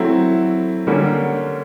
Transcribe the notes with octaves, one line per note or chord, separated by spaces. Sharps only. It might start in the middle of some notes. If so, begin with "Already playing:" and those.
Already playing: F#3 A3 C4 E4
D3 G3 A#3 C#4